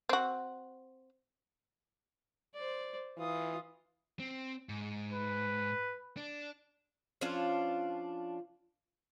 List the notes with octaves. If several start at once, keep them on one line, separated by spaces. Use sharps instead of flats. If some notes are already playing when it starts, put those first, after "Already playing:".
C4 F#4
C5 D5
E3 F4 D#6
C4
G#2
B4
D4
F3 C#4 D4 F4